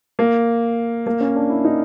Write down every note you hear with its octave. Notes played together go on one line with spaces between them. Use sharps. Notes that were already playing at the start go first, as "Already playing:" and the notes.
A#3
A#3
C#4
D4
E4
D#4